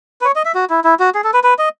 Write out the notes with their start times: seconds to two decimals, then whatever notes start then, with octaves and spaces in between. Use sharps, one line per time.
0.21 B4
0.25 C#5
0.36 D#5
0.45 E5
0.55 F#4
0.70 E4
0.84 E4
0.99 F#4
1.14 G#4
1.24 A4
1.34 B4
1.44 B4
1.59 D#5